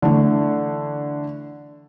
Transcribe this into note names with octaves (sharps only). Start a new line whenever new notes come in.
D3 E3 A3